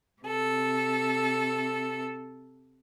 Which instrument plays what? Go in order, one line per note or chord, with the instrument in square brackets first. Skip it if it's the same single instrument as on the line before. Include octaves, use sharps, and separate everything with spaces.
[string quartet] C3 A4